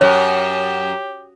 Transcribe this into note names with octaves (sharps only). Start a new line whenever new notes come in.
F#2 G4 C#5